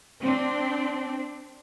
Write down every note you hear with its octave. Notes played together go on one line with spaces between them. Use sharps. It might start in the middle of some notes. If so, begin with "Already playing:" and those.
C4 D4